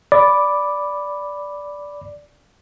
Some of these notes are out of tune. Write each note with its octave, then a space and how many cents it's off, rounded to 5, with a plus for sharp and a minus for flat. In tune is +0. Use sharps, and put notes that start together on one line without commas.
D5 -10 B5 +0 D6 +0